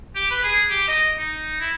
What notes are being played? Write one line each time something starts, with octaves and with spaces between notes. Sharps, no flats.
G4
B4
G#4
G4
D#5
D#4
E4